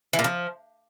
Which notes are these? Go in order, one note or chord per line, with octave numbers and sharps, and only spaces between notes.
E3
A#2
F3